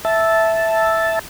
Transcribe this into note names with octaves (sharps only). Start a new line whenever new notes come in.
E5 A5